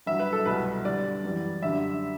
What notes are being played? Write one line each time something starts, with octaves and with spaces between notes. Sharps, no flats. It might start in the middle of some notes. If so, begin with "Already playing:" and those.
G2 F#3 E5
B4
A4
C2 B2 F#3 B4
G2 D3 G3 D5
F#2 E3 G3
F#2 D3 G3 E5